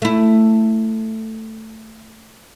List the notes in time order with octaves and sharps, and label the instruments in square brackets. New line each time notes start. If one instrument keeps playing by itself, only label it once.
[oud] A3 E4